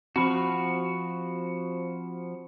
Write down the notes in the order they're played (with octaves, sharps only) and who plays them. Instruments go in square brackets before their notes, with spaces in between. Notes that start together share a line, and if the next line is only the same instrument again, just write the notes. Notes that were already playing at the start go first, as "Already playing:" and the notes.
[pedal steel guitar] F3 F#4 [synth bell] C4 B5